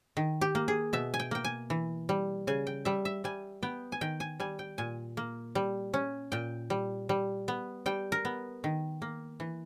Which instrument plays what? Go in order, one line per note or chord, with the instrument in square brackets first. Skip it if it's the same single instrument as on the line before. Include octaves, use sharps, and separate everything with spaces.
[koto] D#3
G4
A#3
G#4
B2 E5
G#5
G5
A#3 G5
G#5
E3
G3
C#3 G#5
G5
G3 E5
E5
G3 G#5
B3 G5
G#5
D#3 G5
G#5
G3 G#5
G5
A#2 G#5
A#3
G3
C#4
A#2 G5
G3
G3
B3
G3 G5
A#4
B3
D#3
A#3
E3